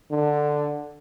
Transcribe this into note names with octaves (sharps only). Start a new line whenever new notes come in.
D3